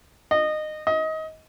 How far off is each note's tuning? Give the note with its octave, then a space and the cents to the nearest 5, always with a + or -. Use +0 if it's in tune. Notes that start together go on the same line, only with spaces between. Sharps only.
D#5 -20
D#5 +25